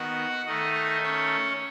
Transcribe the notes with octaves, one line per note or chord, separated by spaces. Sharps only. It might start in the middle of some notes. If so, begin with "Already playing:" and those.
Already playing: D#3 B3 F#4 F#5
D#3 A3 D#4 D#5
C#4 C#5